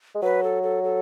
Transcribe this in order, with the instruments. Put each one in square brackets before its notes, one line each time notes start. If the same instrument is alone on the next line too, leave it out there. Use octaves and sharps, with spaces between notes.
[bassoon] G#3
[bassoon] F#3 [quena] B4
[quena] A4
A4
A4